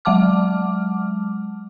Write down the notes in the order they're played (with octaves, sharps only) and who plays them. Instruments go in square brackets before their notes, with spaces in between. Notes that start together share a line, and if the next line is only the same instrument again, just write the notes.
[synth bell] F#3 G#3 F#5 A5 D6 F6